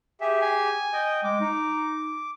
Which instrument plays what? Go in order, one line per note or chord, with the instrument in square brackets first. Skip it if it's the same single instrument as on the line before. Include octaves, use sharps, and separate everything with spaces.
[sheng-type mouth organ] G4 G#4 [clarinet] E5
[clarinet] G#5
[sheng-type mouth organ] D#5 G5
[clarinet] G#3 [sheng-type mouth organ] D6
[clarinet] D#4